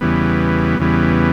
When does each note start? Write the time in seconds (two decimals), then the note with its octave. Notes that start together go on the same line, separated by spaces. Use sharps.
0.01 E2 C#3 E3 G3 B3
0.79 E2 C#3 E3 G3 B3